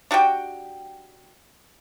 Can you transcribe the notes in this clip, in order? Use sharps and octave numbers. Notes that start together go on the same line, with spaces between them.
D4 F#4 G4 G5